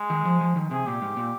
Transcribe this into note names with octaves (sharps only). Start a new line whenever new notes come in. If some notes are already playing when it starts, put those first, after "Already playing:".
Already playing: G#3
D#3
F3
F3
D#3
C3 G#4
A#2 G4
G#2
A#2